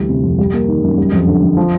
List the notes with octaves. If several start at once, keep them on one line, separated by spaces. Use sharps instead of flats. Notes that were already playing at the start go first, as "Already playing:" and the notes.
Already playing: D2 E3 G3
C3
F2
G3
A#3
D#3
F#2
G3
F2
D3
F2
F3